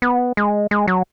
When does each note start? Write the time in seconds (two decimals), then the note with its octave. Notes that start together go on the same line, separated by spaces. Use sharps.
0.02 B3
0.37 G#3
0.71 G#3
0.87 F#3